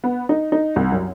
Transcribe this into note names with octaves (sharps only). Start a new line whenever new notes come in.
B3
D#4
D#4
C2
F#2